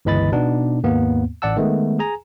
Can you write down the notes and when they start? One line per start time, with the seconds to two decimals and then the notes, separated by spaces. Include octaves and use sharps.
0.05 G1 C#2 E3 D#5 B5 A6
0.32 B2 B3 D4 D#4
0.83 D#2 G#2 A#3 B3
1.42 A1 D5 F#5 A5 E6
1.57 D#3 G#3 A3 B3
1.99 G#4 G#5 A#5